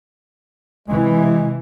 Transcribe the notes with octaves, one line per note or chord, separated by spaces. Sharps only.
C3 E3 G#3